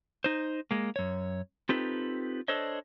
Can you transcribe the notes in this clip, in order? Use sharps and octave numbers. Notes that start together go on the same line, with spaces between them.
D#4 C5
G#3 A#3
F#2 C#5
C4 D#4 F4 G4 A4 B4
D4 A4 C5 C#5 D#5